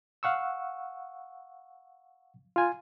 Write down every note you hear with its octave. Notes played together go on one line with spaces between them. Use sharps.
F5 F#5 C#6 E6
F4 G#5